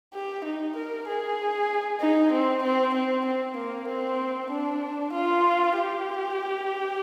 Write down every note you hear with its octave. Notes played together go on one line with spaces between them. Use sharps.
G4
D#4
A#4
G#4
D#4
C4
C4
C4
C4
A#3
C4
D4
F4
G4